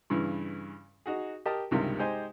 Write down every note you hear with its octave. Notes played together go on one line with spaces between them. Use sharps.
G2 C#3 E3
D#4 F#4 G#4
G4 A#4 D#5 A5
C#2 G2 C3 D#3 G#3
G#3 D#4 G4 C5 G#5